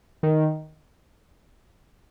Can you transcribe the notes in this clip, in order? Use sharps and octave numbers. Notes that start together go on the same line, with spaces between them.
D#3